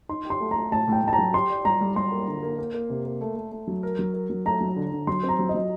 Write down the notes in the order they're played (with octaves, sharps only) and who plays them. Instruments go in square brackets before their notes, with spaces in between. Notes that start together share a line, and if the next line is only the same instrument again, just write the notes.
[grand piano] D#4 [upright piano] C6
[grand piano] G4
[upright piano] C6
[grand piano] A3
[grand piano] A3 [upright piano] A#5
[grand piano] A2 [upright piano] A5
[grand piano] A2 [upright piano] G5
[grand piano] A2 [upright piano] A5
[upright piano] A#5
[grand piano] F#3
[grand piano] G4 [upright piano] C6
[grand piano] D5
[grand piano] G3 [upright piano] A#5
[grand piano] G3
[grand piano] G3 [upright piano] C6
[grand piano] A#3
D3
A#3
A#3
A#3
C3
A#3
A3
A3
A3
F#3
A#4
F#3
A#4
F#3
[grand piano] A3 [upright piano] A#5
[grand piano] F#3
D3
D3
[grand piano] F#3 [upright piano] C6
[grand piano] C4
[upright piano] A#5
[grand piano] F#3
[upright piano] D#5
[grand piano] F#3